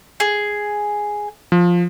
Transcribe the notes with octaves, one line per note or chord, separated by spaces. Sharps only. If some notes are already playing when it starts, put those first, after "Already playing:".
G#4
F3